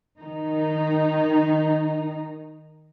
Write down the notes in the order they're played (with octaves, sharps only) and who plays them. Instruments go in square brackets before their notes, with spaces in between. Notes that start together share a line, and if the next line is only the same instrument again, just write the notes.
[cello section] D#3 D#4